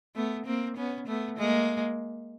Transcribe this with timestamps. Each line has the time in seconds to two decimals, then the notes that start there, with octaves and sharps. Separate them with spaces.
0.15 A3 B3
0.46 A#3 C4
0.77 B3 C#4
1.07 A3 B3
1.37 G#3 A#3